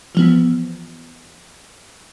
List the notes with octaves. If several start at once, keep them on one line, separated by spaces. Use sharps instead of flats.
E3 F3 B3